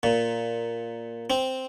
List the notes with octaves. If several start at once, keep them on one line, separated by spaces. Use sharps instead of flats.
A#2
C4